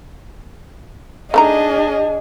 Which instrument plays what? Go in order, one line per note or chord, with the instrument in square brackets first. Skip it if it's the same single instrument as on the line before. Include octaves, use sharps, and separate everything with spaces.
[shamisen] A3 D#4 A#5 [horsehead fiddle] D4 G#4 [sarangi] D#5